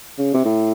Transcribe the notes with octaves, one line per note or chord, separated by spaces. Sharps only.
C#3
C3
A2